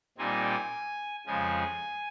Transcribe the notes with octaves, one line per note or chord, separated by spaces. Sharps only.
A#2 G3 C4 D#4 G#5
F2 C#3 F3 G#3 G#5